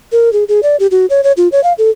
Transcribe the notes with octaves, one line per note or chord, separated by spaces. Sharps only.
A#4
G#4
G#4
D5
G4
F#4
C#5
C#5
F4
C#5
F5
A4